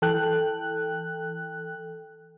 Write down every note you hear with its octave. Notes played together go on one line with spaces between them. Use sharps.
E3 A4 G5 F#6